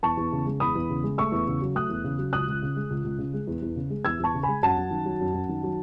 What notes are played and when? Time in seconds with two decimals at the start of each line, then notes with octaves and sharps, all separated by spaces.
0.03 E2 A5 C#6
0.17 E2
0.32 C#3
0.46 G#3
0.60 E2 B5 D#6
0.75 E2
0.90 C#3
1.03 G#3
1.18 A3 C#6 E6
1.32 E2
1.48 C#3
1.62 F#3
1.75 A3 D#6 F#6
1.89 E2
2.04 C#3
2.18 F#3
2.33 C#2 D#6 F#6
2.48 C#2
2.62 C#3
2.76 G#3
2.90 C#2
3.04 C#2
3.18 C#3
3.34 G#3
3.47 E2
3.62 E2
3.76 C#3
3.90 G#3
4.05 E2 E6 G#6
4.20 E2 A5 C#6
4.34 C#3
4.43 G#3 G#5 B5
4.63 F#2 F#5 A5
4.77 F#2
4.91 D#3
5.06 F#3
5.20 F#2
5.34 F#2
5.49 D#3
5.63 F#3